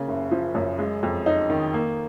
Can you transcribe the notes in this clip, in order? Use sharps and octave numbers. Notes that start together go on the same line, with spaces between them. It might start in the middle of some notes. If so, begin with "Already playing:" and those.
Already playing: C#3 A#3
F#1
F3
F#2
G#3
F2
D#4
D#3
A#3